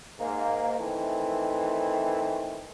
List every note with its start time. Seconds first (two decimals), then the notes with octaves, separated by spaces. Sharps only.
0.20 G#2 A#3
0.78 D#3 E3 A3 C4